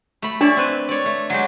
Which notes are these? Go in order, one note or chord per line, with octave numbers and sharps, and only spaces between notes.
A3 B5
D4 C#5 D5 E5
C4 B4
C#5 D5
A3
F#3 G#3 G4